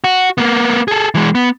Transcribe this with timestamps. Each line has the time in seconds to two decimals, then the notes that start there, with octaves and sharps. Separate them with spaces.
0.04 F#4
0.38 A#3 B3
0.88 G#4 A4
1.15 E3 G#3
1.35 B3